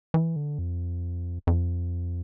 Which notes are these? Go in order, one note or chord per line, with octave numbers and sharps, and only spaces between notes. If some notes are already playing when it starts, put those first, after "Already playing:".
E3
D3
F2
F2